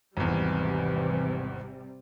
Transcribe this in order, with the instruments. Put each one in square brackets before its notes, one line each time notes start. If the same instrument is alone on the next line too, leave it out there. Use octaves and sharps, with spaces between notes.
[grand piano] G#1 E2 [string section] C3 G3 [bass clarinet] E3